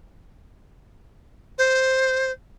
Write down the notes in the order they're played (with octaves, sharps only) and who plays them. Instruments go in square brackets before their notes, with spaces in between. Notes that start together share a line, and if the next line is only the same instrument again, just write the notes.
[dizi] C5